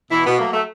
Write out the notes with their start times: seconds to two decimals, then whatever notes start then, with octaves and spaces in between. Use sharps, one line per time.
0.11 B2 E3 E4
0.25 B2 B3
0.39 F#3 A3 A#3
0.52 A3